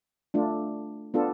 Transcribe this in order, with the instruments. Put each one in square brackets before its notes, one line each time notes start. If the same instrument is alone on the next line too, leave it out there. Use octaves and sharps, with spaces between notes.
[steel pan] A3 D4 F4
B3 D4 F4 A4